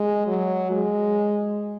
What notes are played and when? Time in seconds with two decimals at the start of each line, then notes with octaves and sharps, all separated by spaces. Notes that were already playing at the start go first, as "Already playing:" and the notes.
Already playing: G#3
0.27 F#3
0.71 G#3